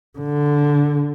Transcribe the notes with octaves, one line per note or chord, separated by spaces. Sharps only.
D3